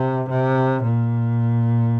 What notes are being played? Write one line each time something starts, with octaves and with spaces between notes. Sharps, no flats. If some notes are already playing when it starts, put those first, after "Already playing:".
Already playing: C3
C3
A#2